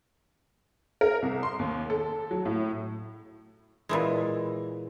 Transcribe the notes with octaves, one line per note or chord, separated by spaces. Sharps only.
A#4
C2
C6
D#2
A4
F#3
A2
A#2 E3 G#3